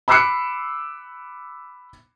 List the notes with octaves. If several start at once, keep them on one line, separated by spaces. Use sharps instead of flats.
B5 D6 E6 F#6 C7 C#7